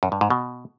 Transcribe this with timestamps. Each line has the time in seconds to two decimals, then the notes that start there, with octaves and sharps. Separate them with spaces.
0.03 F#2
0.12 G2
0.21 G#2
0.30 B2